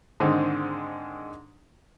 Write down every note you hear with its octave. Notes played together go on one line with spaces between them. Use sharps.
G#2 D3 D#3 G#3 C4